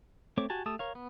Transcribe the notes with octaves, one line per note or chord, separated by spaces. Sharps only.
A3 C4 C#5 D6
F#4 G4 G#5 A5
A3 G4 A5 D#6 E6
A#4 C#5 F5
B3